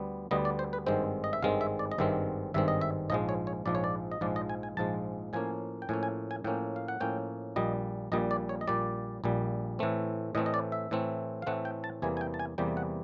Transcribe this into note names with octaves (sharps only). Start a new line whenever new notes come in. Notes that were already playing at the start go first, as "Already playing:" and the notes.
Already playing: D2 D3 G3 B3
D2 D3 G3 B3 D#5
D5
C5
B4
G#1 G2 D#3 G#3 C4 C5
D#5
E5
G#1 G2 D#3 G#3 C4 F5
E5
D5
D#5
G#1 G2 D#3 G#3 C4 E5
G#1 G2 D#3 G#3 C4 E5
D#5
E5
A#1 G#2 F3 G#3 D#5
C#5
C#5
A#1 G#2 F3 G#3 D5
C#5
D5
D#5
A#1 G#2 F3 G#3 D5
D#5
G#5
G#5
A#1 G#2 F3 G#3 A5
A2 F3 A#3 C#4 G#5
G5
A2 F3 A#3 C#4 G#5
G#5
G#5
A2 F3 A#3 C#4 G5
F5
F#5
A2 F3 A#3 C#4 G5
A#1 A#2 G3 D#5
A#1 A#2 G3 D#5
D5
C#5
D#5
A#1 A#2 G3 D5
A#1 A#2 G3
A2 E3 A3 C4
A2 E3 A3 C4 D#5
D#5
D5
E5
A2 E3 A3 C4
F5
A2 E3 A3 C4 F#5
G5
A5
E2 C3 E3 G3 A#3 G#5
G#5
G5
A5
G#5
E2 C3 E3 G3 A#3 G5
F#5